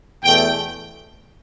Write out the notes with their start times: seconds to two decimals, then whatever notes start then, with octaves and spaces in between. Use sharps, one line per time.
0.23 E2 B2 A3 G5